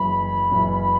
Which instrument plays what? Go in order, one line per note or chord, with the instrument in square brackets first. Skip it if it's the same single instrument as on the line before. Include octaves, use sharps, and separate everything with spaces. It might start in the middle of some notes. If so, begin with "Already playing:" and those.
Already playing: [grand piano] F#1 F#2 E3 [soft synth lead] B5
[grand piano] F#1 F#2 E3